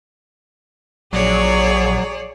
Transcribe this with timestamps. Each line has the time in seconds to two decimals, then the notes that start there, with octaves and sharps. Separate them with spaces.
1.13 A#1 F#3 G#4 C#5 D5